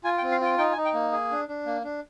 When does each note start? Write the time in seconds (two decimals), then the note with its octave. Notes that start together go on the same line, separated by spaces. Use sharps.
0.04 F4 G#5
0.18 G5
0.22 C4
0.32 F5
0.41 F4 G5
0.58 D#4 G5
0.72 G#5
0.76 D#4
0.85 G5
0.94 A#3
1.12 G#4
1.31 D4
1.48 D4
1.66 A#3
1.84 D4